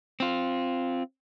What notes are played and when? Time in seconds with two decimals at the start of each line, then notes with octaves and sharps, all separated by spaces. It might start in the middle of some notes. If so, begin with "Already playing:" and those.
0.20 C4 F4